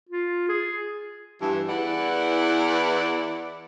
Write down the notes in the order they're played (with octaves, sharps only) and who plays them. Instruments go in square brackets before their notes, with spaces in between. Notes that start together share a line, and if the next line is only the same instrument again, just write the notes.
[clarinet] F4
G#4
[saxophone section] G2 E3
E2 E3 D5 F#5